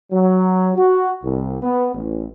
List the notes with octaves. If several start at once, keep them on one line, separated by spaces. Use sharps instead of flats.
F#3
F#4
C2
B3
A1